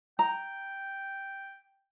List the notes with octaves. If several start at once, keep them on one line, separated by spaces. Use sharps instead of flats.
G5 A#5